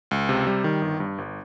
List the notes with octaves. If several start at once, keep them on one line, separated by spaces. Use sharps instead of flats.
C#2
C3
G3
D#3
G1
G2
G1